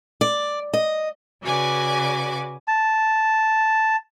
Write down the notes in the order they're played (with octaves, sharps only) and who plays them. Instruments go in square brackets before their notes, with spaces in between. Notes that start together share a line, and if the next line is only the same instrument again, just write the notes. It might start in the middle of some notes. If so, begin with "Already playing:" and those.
[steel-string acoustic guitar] D5
D#5
[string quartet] C#3 F#4 B4 D5 G#5 D6
[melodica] A5